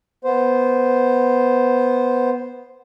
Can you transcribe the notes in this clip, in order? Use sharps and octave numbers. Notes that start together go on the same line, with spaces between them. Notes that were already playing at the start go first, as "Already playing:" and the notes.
B3 C5